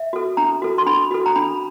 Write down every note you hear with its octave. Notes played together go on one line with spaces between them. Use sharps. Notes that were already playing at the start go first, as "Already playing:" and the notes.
Already playing: E5
F#4 A4
D4 A#5
F#4 A4
C6
D4 B5
F#4 A4
A#5
D4 B5